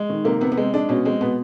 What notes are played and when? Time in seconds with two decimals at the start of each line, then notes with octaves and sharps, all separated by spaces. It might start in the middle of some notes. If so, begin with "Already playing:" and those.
Already playing: G#3
0.10 D#3
0.24 C3 A#3
0.41 C3 B3
0.52 B3
0.57 G#3 C4
0.74 G#3 D4
0.89 B2 C#4
1.05 G#3 C4
1.21 B2 B3